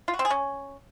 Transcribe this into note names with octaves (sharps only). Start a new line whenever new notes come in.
F4
F#4
C4
G#4
C#4